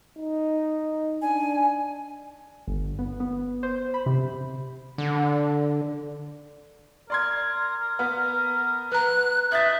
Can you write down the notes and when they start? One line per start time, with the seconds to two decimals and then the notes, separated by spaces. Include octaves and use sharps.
0.18 D#4
1.22 D4 G#5
2.67 G1
2.99 B3
3.20 B3
3.63 C5
3.94 B5
4.06 C3
4.98 D3
7.10 A#4 D5 C6 G#6
7.99 B3
8.92 B4 A#5 F#6
9.52 D#4 E5 F#6 A6